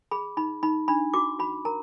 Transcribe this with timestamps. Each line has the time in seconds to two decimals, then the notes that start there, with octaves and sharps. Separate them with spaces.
0.11 G#4 B5
0.37 D#4 B5
0.63 D#4 B5
0.88 D4 B5
1.14 F#4 D6
1.39 F#4 B5
1.65 A#4 A#5